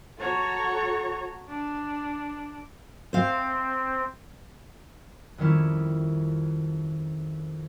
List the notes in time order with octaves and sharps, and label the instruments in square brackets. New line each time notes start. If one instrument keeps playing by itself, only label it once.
[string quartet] F#4 A4 C#5 A#5 C#6
D4
[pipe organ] C4 [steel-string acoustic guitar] C5 F5
[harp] F2 D#3 G3 C#4 E4